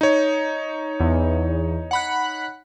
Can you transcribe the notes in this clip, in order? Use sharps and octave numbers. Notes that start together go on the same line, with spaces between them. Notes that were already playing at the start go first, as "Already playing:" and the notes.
D#4 C#5
E2
F#5 B5 F#6